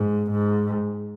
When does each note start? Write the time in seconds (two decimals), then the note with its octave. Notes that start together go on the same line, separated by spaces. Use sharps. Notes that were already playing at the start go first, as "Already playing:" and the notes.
Already playing: G#2
0.31 G#2